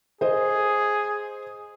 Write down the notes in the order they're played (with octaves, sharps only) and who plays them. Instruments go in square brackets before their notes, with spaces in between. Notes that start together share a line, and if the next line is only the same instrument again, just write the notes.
[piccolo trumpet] G#4 [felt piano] C5 D#5